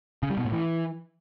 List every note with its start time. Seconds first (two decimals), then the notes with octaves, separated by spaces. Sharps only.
0.23 C#3
0.30 G3
0.37 B2
0.45 A2
0.52 E3